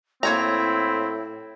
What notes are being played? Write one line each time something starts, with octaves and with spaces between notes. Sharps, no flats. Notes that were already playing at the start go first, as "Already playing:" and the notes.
A2 A#3 C4 E4 C#5 A#5